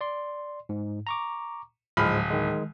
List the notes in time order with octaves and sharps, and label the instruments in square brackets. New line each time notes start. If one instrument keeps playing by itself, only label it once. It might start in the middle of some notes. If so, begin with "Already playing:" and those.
[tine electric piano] D5 C6
G#2
A#5 C#6 D6
[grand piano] D1 B5 F6 [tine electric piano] G#2 F3 G#3
[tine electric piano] D#3 G#3